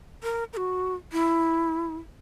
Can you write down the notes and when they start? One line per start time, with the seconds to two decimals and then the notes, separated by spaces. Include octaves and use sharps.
0.23 A#4
0.53 A#4
0.57 F#4
1.12 E4